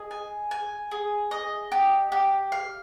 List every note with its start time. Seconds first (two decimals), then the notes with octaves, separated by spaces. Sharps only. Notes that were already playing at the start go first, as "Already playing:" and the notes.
Already playing: G#4 D#5
0.11 G#5
0.51 G#5
0.91 G#4
1.31 D#5
1.72 G4
2.12 G4
2.52 F5